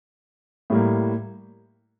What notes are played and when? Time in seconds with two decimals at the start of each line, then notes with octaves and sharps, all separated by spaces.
0.70 A2 G3 A#3